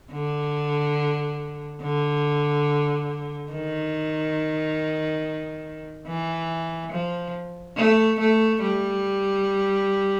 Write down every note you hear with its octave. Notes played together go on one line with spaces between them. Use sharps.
D3
D3
D#3
E3
F3
A3
A3
G3